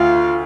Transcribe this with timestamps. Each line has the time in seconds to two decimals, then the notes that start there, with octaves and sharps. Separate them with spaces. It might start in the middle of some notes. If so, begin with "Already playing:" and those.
Already playing: D2 F4